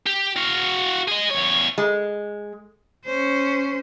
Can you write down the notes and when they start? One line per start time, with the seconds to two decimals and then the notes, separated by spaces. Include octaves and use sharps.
0.07 G4
0.37 F#4 F5
1.08 G#4 D#5
1.31 E2 C#5
1.78 G#3
3.06 C#4 C5